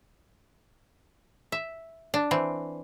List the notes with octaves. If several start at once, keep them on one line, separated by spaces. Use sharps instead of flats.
E5
D4
E3 C4